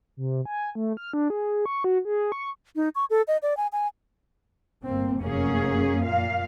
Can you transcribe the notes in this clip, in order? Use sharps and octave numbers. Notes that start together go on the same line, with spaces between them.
C3
G#5
A3
F6
D4
G#4
C#6
F#4
G#4
C#6
D#4
C#6
A4
D#5
D5
G#5
G#5
G1 A#3 C4
F1 F#2 A#3 C#4 G#4
A#2 F5